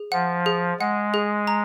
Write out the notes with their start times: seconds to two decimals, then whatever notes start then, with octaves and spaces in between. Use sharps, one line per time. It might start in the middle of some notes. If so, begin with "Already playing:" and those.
Already playing: G#4
0.12 F3 F#5
0.46 G#4
0.80 G#3 F#5
1.14 G#4
1.47 A#5